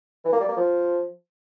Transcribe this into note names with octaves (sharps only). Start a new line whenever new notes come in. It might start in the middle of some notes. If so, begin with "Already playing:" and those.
E3
A#3
G3
A#3
F3